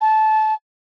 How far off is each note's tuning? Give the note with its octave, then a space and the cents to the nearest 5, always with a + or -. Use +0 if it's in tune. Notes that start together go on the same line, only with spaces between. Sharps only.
A5 -20